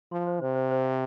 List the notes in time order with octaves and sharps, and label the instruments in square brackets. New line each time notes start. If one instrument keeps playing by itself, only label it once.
[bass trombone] F3 [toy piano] C6
[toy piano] C5
[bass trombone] C3 [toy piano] C5
[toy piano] C5
C5
F5